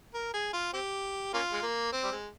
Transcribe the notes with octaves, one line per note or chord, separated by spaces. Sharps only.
A#4
G#4
F4
C4 G4
A#3 C#4 F4
G#3
A#3
C4
G3
G#3